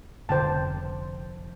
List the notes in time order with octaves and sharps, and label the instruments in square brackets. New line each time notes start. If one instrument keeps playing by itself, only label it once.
[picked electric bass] F1 F2 D3 [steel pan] C5 G5 A5